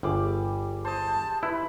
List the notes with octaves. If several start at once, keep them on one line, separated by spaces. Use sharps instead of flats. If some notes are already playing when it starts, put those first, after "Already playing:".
G1 G3 G#4 D6
C5 D#5 A5
E4 B4